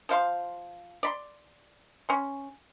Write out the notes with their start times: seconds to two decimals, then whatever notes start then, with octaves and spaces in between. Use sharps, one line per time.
0.09 F3 C5 F5 C6
1.03 D5 B5 C6
2.09 C#4 C6